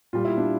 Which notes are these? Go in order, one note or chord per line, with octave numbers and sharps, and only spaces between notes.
A#2 G3 F4
E4
D4